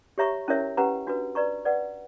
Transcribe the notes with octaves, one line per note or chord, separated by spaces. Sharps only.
G4 C#5 E5 A#5 C#6
C#4 E4 A#4 C#5 E5
C#4 G4 B4 F#5 A#5
D4 F#4 B4
B4 D5 A#5 C#6
B4 D5 F#5